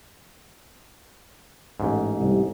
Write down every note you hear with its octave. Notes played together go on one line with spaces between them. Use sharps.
A1 G#2
C2